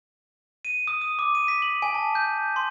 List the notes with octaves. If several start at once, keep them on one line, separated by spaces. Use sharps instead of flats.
D#7
D#6
D#6
D6
D#7
B6
F#7
G#5
A5
G6
C6